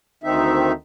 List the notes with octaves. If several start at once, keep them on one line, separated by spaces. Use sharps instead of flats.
D2 D#3 C4 D#4 E5